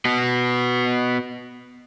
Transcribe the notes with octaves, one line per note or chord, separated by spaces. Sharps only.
B3 F#4